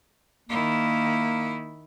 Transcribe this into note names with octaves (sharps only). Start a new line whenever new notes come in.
D#3 A#3 E4